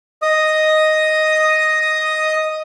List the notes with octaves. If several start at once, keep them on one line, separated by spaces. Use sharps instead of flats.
D#5 D#6